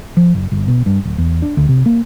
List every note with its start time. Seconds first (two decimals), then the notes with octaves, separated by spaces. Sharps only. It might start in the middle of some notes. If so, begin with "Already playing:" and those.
0.17 F3
0.35 F#1
0.52 G1
0.68 B2
0.86 G2
1.05 D1
1.18 E2
1.42 D4
1.57 D2
1.69 C3
1.86 A#3